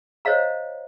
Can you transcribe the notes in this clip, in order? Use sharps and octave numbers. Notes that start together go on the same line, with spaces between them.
C5 C#5 D#5 F5 A#5